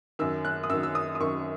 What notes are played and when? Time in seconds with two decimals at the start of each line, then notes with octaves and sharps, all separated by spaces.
0.19 F#2 D#3 E6
0.45 F#6
0.64 D#6
0.70 F#2 D#3 E6
0.83 E6
0.95 D#6
1.15 D#6
1.20 F#2 D#3 C#6